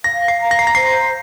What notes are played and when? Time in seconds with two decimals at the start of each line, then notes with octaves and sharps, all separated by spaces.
0.04 F5 A#6
0.28 C7
0.40 A#5
0.51 A#6
0.59 C7
0.67 A#6
0.75 C5 C7